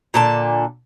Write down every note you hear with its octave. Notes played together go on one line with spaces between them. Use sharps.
A#2 D3 A5